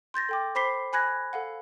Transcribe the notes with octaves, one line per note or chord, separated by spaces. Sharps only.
C6 G6 A6 A#6
A4 G5 D6
C5 B5 D6 B6 C7 G7
G#5 B5 F#6 G#6 A#6
A4 F5 F#5